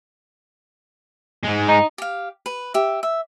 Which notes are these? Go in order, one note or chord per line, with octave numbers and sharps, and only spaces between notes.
G#2 G#3
D#4
G4 F5
B4
G4 E5
E5